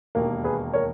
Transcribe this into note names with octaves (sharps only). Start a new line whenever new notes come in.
E1 D#2 D#3 A#3 A#4
G#4 B4
A#4 C#5